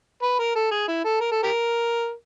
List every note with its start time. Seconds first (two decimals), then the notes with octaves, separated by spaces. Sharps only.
0.22 B4
0.39 A#4
0.56 A4
0.71 G#4
0.88 E4
1.05 A4
1.21 A#4
1.32 A4
1.43 G4 A#4